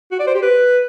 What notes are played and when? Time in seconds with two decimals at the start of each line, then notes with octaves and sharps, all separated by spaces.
0.12 F#4
0.19 D5
0.27 C5
0.35 G4
0.42 B4